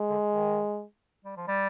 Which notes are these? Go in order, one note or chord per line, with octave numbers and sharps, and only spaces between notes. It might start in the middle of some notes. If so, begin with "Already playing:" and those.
Already playing: G#3
D3
D#3
G3
F3
G3